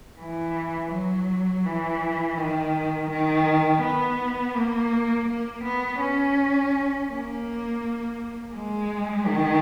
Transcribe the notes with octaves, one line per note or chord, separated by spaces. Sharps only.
E3
F#3
E3
D#3
D#3
B3
A#3
A#3
B3
C#4
A#3
G#3
D#3